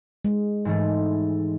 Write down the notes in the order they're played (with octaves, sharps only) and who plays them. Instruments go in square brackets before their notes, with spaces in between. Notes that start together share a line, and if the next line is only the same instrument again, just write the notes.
[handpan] G#3
[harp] G#2 E3 A3